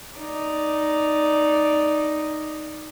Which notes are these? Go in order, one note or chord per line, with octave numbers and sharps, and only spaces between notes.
D#4 D5